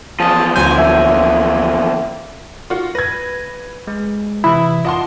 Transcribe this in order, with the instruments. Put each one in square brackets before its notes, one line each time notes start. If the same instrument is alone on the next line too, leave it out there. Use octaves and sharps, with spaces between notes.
[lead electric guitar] E2 F3 [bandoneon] G#4 A5
[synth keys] D2 F#3 G#5 [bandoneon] C5 [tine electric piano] G6
[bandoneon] D3 A#3 [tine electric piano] E5
[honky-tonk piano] F4 F#4
[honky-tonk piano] B4 G#6 [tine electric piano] A#6
[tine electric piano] G#3
[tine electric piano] C3 E3 D#6 [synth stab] E4
[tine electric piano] F4 F5 F#5 [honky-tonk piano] D#5 A5 C6